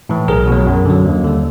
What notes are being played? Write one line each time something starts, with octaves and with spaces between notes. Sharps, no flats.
A2 E3
B1 G#4 A#4
B2 F#3
F#2
D3 F#3
D#2
D3 G3